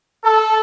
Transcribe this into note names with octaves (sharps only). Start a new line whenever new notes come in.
A4